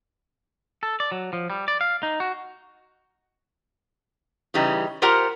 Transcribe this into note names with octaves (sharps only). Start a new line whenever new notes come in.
A4
D5
F#3
F3
G3
D5
F5
D#4
F#4
C#3 E3 G3 D#4
F4 G4 A#4 C5 F#5 A#5